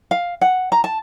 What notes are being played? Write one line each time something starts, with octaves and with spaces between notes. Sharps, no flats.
F5
F#5
A#5
A5